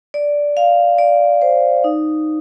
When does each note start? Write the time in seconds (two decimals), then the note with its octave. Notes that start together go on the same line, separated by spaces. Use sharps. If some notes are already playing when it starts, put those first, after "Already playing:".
0.14 D5
0.57 F5
0.98 D5
1.42 C5
1.84 D#4